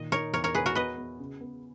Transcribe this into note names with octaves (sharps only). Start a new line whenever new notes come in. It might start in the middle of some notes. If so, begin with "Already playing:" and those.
Already playing: A#2 D#3 D#5
D#4 A#4 C#5
E2 A#4 C#5
A#4 C#5
E2 G#4 B4
F#4 A#4
B3 B4 D#5
B3
C#3
B3